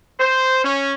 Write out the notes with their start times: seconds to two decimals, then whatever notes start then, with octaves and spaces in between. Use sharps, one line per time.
0.20 C5
0.64 C#4